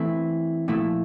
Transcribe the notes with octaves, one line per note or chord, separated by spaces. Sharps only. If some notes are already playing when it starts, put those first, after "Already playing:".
Already playing: E3 A3 C4 E4
A#2 F3 A3 E4